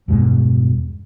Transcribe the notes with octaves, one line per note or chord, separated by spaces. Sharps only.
E2 G2 B2 G#3